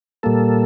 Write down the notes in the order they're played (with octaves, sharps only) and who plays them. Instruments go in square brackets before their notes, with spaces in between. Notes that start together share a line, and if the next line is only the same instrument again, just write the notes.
[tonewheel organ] A#2 G3 A#3 A4